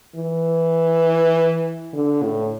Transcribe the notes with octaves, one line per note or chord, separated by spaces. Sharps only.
E3
D3
A2